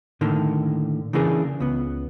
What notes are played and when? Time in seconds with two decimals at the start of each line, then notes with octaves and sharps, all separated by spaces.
0.21 A2 D3 D#3 A#3
1.13 C#3 E3 A#3 D4 G#4
1.60 C#2 B3